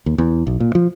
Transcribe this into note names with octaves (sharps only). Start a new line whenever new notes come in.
D#2
E2
B1
A#2
F3